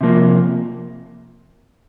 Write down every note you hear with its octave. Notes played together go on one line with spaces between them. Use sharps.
C3 F3 A#3